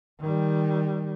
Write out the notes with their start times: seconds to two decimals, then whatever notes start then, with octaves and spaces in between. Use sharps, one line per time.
0.20 D#3 G3